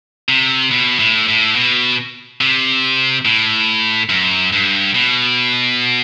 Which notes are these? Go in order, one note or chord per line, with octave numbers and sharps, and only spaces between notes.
C3
B2
A2
A2
B2
C3
A2
F#2
G2
B2